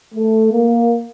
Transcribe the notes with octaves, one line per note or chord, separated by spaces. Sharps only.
A3
A#3